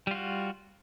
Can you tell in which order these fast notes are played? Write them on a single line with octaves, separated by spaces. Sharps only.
G3 F4 F#4